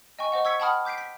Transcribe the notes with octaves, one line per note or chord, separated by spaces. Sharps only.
D#5 G5 G#5 C#6
C5 D#5 F#5 C#6
C#6 E6 G#6 B6 C#7
F#5 G5 A5 B5 D#6 F6
D6 G6 B6 C7 D7
B6